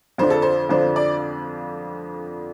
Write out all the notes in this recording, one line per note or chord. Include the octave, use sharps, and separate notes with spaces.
F2 D3 F3 D4 C5
A4
C5
F2 D3 F3 D4 C5
D5